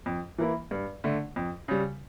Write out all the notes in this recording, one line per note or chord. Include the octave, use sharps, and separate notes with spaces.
F2
E3 A#3 E4
G2
D3 A3
F2
C#3 G3